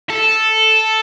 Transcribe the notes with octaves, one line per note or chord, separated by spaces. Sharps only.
A4